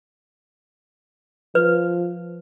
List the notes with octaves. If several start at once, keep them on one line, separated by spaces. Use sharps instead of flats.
F3 B4